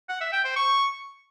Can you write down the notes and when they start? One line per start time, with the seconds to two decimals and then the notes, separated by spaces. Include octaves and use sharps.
0.09 F#5
0.21 E5
0.33 G5
0.44 C5
0.56 C#6